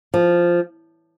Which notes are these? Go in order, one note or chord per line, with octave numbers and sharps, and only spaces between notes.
F3